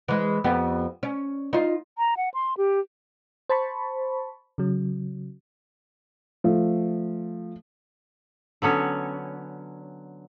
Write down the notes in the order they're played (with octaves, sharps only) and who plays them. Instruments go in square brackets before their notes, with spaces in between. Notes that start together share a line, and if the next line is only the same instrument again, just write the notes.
[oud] E3 G#3
F2 B3 G4
C#4
D#4 F4
[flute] A#5
F#5
C6
G4
[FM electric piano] C5 A5 B5 C#6
C#3 F#3
[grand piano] F3 A3
[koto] D3 F#3 B3 C#4